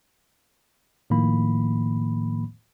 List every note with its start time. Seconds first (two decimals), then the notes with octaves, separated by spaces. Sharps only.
1.10 A2 D#3 F3 A#3 B5